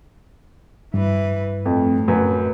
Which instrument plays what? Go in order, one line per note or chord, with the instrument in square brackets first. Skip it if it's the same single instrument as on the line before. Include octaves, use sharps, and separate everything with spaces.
[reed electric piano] G2 [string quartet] E3 B4
[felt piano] F2 [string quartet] A2
[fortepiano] F#2 [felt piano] B4